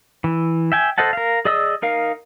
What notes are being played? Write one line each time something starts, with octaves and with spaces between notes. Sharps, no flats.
E3
E5 G5 G#5
A4 C5 D#5 F#5 A5
A#4 F5
G#4 D5 D#5 D#6 E6
D#4 A#4 F5